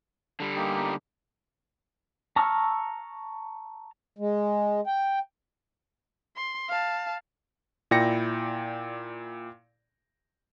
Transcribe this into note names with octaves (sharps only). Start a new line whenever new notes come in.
D3 G3
A#3 D#4 G4
A5 A#5 C#6 E6 F6
G#3
G5
C6
F5 A5
A#2 E4 D5 G5 A#6 C#7